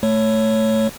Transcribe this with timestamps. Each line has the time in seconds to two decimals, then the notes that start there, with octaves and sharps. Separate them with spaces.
0.03 A3 C#5